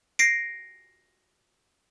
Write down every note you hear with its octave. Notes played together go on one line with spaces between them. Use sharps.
A#6 C7 D7